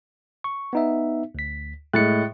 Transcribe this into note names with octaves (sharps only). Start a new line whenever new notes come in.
C#6
B3 D#4 E5
D2 B6
A2 G#3 F#6 A6 C#7